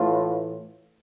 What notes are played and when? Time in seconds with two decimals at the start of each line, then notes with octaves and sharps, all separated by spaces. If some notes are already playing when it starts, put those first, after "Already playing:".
Already playing: A2 E3 F4